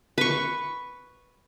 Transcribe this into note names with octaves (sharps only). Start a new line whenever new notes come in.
B4 C#6